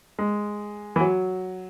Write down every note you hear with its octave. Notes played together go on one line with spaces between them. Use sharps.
G#3
E3
F#3